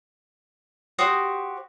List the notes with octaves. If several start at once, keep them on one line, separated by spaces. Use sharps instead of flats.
F#4 G4 C5 D#6